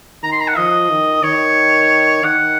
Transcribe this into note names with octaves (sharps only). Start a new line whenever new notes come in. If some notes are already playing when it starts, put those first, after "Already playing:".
D#3 A#5
C6
A#5
F#5
F3 D#5
D#3
D#3 C#5
D#3 F#5